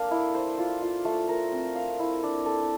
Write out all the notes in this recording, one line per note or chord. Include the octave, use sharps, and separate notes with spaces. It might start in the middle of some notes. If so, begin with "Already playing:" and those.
Already playing: A#3 D4 A4 F5
E4
C5
F4
F4
A3
A#4
C4
F5
E4
D4
A4